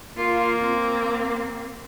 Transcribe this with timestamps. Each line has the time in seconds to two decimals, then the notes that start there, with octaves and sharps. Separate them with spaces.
0.18 A#3 F4
0.59 C4